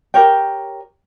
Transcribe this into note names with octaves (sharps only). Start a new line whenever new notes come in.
G4 A#4 C#5 G5